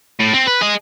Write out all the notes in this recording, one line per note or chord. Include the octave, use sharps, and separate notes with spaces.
A2
C4
B4
G#4 D#5